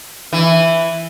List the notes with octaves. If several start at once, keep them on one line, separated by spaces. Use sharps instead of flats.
E3